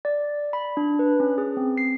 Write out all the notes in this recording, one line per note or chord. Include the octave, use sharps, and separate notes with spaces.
D5
B5
D4
B4
C#4
G#4
C4
C7